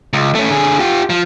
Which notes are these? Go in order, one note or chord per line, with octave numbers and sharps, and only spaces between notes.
C#2
A3 C#4
D3 G#4
F4 G4
F3